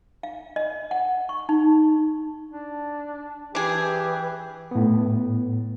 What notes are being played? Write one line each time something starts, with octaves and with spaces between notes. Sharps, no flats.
F5
D#5
F#5
C#6
D#4
D4
E3 D4 G4 G#4
A2 B3